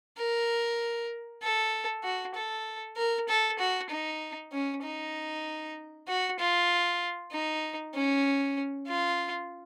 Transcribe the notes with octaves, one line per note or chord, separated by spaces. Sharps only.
A#4
A4
F#4
A4
A#4
A4
F#4
D#4
C#4
D#4
F#4
F4
D#4
C#4
F4